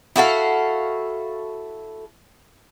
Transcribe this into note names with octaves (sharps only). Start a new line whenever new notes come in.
E4 F#4 A4 F5